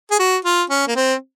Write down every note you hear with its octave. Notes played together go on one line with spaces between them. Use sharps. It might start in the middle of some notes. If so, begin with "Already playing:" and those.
G#4
F#4
F4
C#4
A#3
C4